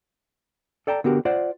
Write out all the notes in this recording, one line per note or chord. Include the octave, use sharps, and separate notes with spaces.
A4 D5 G5 A5 A#5
D3 B3 F#4 G4 A#4
F4 C5 D5 F#5